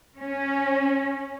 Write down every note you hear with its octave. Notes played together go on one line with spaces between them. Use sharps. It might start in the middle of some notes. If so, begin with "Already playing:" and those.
C#4